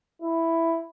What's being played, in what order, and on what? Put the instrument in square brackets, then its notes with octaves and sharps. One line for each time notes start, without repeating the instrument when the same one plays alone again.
[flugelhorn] E4